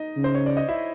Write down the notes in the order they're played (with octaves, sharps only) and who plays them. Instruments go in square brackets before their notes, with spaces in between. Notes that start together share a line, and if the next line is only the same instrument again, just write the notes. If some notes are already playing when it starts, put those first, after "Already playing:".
Already playing: [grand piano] D#4 D#5
[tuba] C#3
[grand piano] C5
C#5
D5
D#5
E4 E5